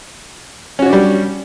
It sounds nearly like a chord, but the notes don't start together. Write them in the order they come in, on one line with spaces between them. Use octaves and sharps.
C#4 F#4 C#5 D4 G3